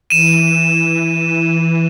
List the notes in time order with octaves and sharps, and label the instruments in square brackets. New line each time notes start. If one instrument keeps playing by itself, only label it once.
[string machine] E3 [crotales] D#7 E7